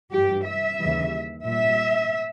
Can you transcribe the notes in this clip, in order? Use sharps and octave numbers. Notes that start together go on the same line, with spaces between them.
G2 E3 G3 G4
E5
D#2 C#3 E3 G3
A#2 G3 E5